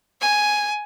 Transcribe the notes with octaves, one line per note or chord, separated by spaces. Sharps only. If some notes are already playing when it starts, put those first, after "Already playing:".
G#5